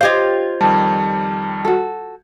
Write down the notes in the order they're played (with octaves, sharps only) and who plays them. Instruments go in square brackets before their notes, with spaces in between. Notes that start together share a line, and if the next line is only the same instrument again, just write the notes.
[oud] F4 G4 C5 [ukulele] D#5 F5 [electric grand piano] G6 G#6
[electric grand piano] F2 D#3 G3 [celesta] A5
[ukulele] F#4 A4